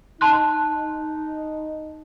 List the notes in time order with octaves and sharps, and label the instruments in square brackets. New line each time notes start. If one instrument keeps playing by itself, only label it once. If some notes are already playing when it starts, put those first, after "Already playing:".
[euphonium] D#4 [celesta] A5 C6 F#6